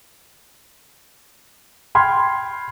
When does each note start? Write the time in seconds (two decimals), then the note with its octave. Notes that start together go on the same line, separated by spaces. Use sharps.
1.95 G5 B5 C6 F6 G#6